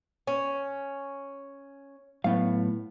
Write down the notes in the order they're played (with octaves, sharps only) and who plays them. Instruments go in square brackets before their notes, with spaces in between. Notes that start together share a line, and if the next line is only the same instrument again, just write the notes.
[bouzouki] C#4
[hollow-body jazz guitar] A2 F5 [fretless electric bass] F#3 A3 B3